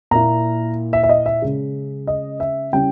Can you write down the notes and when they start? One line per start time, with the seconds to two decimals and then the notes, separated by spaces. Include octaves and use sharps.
0.11 A#2 A#3 E4 A#5
0.93 E5
1.03 E5
1.09 D#5
1.26 E5
1.42 C#3 G#3 C#4
2.07 D#5
2.40 E5
2.73 C#3 G3 C#4 E4 G5